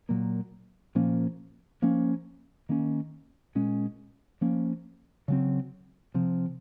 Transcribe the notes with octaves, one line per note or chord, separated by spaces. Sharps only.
A#2 F#3 A#3
A#2 F3 A#3 C#4
F3 A#3 C#4
D#3 A#3 C#4
A#2 G#3 C#4
F3 A#3 C#4
C#3 F#3 C4
C3 F3 C4